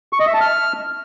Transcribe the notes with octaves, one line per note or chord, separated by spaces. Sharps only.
C#6
D#5
E5
A5
F6